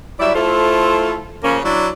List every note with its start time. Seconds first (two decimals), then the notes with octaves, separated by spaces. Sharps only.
0.20 F#3 G3 E4 D5 E5
0.35 A3 E4 F4 A4 C5
1.43 C#3 F3 A#3 C#4
1.64 F#3 D4 E4 D5